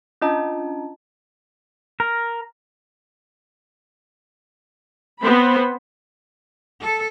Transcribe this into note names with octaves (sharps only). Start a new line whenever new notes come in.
C#4 D4 F4 D#5 A5 A#5
A#4
B3 C4 C5 B5
A4